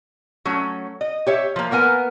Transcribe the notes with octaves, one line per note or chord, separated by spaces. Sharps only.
F#3 A3 C#4
D#5
G4 C#5 E5
F3 A#3
A#3 B3 A#4 G#5